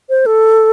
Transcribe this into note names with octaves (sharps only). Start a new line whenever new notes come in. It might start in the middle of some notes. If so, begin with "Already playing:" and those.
C5
A4